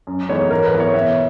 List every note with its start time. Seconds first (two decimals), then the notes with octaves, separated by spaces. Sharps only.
0.07 F#2
0.29 E3 G#3 B3 D#4 C#5
0.50 G#2 A#4
0.65 B4
0.73 E3 B3 E4
0.80 C#5
0.94 B2 E5